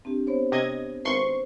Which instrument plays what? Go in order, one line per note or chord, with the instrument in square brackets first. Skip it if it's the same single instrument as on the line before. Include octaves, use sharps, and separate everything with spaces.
[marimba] C4 D4 G4
B3 C5 C#5
[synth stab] C3 D#5 G#6
[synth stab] G#1 C6 C#6 [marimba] B4 C5